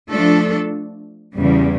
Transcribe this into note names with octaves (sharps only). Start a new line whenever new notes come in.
F3 A3 D4 A4
E2 C#3 G3